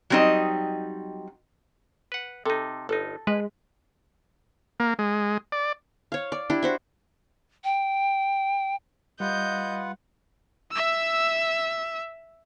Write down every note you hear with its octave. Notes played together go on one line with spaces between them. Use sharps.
F#3 G3 C4 D#4 D#5
B4 F#5
C3 D#4 A4
G1 D#4 A4
G#3 B4
A#3
G#3
D5
C#5 F5
D5
D4 E4 G4
F#4 C5 E5
G5
G3 F4 B4 D#5 F#5 G6
E5 E6